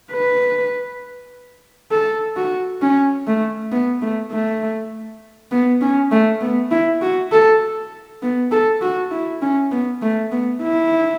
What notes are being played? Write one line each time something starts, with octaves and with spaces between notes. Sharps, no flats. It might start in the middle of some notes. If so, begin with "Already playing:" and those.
B4
A4
F#4
C#4
A3
B3
A3
A3
B3
C#4
A3
B3
E4
F#4
A4
B3
A4
F#4
E4
C#4
B3
A3
B3
E4